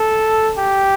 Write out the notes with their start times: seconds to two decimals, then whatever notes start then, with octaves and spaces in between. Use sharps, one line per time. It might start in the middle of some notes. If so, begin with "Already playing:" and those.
Already playing: A4
0.57 G4